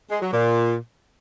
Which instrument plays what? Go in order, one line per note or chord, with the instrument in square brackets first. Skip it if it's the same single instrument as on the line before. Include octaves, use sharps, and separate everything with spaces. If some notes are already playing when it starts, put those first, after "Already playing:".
[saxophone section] G#3
F#3
A#2